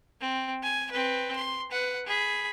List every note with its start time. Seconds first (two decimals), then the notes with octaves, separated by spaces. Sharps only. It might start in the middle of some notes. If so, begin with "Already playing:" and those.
0.21 C4
0.63 G#5
0.92 C4 B4
1.36 C6
1.71 B4 F#5
2.06 G#4 B5